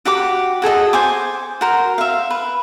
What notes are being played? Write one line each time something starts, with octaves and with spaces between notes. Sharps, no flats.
F#4 G4 F#5 D6
F#4 G#4 A4 D#5
C5 G#5 D6
F#4 A#4 C5
E5 F5
B4